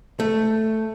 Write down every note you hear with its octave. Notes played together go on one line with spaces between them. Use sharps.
A3